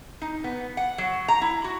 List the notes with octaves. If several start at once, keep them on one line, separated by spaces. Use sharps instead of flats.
D#4
B3
F#5
F#3
A#5
E4
F#4